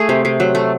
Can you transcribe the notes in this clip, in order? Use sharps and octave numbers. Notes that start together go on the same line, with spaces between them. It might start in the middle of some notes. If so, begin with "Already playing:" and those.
Already playing: A3 G#4
C3
C3
F#3
A3